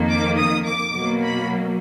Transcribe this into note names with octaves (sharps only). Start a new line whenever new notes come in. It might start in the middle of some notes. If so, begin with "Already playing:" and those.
Already playing: F2 D#3 A#3
D6
D#6
D6
B2 F#3 A#3
B5